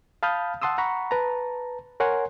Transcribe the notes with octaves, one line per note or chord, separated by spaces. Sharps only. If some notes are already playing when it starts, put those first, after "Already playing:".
F5 A5 B5 D#6 F6 G6
F#5 A5 C6 D#6 E6
F#5 A#5 B5 C#6
B4 A5 A#5
A#4 C#5 F#5 G#5 C6